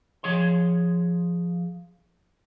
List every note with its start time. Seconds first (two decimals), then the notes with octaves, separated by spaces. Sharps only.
0.23 F3 G#4 C#5 C6